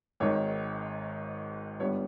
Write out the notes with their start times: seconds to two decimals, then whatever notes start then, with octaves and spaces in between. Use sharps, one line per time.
0.20 G#1 G#2 D#3 C#5
1.79 G1 G2 G3 B3 C#5